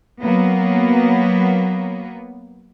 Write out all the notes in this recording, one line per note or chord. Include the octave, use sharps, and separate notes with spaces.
F#3 A#3 B3